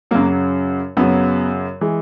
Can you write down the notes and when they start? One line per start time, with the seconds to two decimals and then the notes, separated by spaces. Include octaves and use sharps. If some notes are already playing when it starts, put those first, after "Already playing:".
0.11 F#2 C#3 F#3 A#3
0.97 F#2 C#3 F#3 B3
1.81 E3 G#3